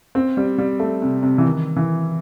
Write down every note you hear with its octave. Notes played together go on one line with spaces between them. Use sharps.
C4
G3
G3
A3
C3
C3
E3
D#3
E3